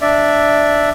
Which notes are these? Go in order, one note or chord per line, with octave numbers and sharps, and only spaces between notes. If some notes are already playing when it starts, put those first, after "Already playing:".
D4 D5 E5